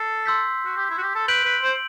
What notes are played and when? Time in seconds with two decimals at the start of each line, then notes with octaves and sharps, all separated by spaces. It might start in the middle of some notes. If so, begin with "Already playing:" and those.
Already playing: A4 C7
0.26 C6 E6 G6 B6
0.65 F#4
0.77 G4
0.90 E4
0.98 F#4
1.02 G4
1.15 A4
1.28 B4 G6 D7 F#7
1.45 B4
1.62 C5